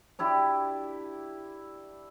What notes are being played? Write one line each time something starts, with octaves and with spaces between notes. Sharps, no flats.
D4 E4 G4 D5